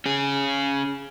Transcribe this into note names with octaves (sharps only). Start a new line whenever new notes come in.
C#4 G#4